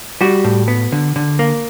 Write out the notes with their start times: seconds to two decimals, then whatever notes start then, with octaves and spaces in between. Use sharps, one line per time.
0.21 G3 F#4
0.45 A2
0.68 B3
0.92 D3
1.16 D3
1.39 A#3